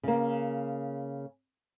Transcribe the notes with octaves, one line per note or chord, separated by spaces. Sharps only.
C#3 A#3